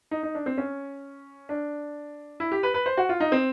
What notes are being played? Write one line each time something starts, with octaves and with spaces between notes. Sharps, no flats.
D#4
D#4
D4
C4
C#4
D4
E4
G4
B4
B4
C5
F#4
F4
D#4
C4